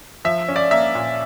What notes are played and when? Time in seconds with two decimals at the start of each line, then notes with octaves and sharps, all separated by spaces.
0.25 F3 E5
0.48 C#4
0.56 D5
0.71 A#3 E5
0.95 A#2